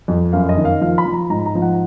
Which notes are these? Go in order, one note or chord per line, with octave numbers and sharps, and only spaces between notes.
F2
F#2 F5
D#5
D#3
F5
F3 F5
B5
F3
A#5
G#2 A#5
A#5
F3
F#5